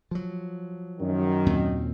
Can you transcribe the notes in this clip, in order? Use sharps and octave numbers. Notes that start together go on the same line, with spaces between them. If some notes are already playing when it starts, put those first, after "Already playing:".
F3 F#3
F#2 D#3
D#2 A#2 C4